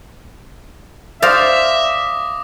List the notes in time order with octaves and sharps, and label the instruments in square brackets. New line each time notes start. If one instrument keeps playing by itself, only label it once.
[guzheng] C5 D5 [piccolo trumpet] E5 [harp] F5 [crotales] D6 D#6 A#6